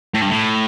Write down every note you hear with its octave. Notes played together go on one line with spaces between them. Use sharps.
A2
G2
A2